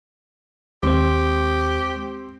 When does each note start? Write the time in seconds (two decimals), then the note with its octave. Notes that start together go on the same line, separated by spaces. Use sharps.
0.83 D#2 G#3 C4 G4 C5